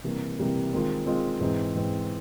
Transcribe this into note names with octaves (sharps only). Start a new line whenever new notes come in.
C3 E3 G3 A#3
C3 E3 G3 A#3
D#3 G#3 C4 F4
D#3 G#3 C4 F4
G#2 E3 G#3 C4
G#2 E3 G#3 C4